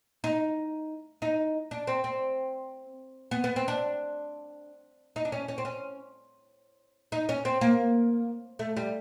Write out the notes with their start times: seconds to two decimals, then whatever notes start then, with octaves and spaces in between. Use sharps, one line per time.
0.24 D#4
1.22 D#4
1.71 D4
1.87 C4
2.04 C4
3.31 B3
3.44 B3
3.56 C4
3.68 D4
5.16 D#4
5.25 D4
5.32 C#4
5.48 C#4
5.58 C4
5.65 C#4
7.12 D#4
7.29 C#4
7.45 C4
7.61 A#3
8.59 A3
8.77 G3